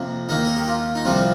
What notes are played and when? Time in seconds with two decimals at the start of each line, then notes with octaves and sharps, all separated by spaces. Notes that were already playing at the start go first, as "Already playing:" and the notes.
Already playing: F2 C3 F3 A#3
0.29 D#2 D#3 A#3 D#4
0.45 A#4
0.56 G4
0.68 F4
0.95 D#4
1.05 C2 C3 F3 C4 F4